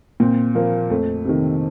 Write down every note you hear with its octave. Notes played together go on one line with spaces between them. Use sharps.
A#2 C4
F3 A#3
F2 A3
C3 D#3